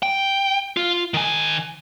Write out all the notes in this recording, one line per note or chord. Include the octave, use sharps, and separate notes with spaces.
G5
F4
D#3 G#5